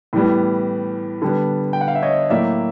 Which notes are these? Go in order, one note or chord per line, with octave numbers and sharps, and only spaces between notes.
A2 E3 G3 B3
D3 G3 B3
G5
F#5
F5
E5
C#5 D#5
A2 F#3 A#3 D5 E5